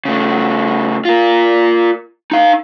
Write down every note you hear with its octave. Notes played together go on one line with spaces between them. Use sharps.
C#3 A3
F4 A#4
D#4 F5